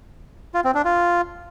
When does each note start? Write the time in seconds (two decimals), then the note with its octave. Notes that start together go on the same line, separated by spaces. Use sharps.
0.54 F4
0.64 C4
0.75 D4
0.85 F4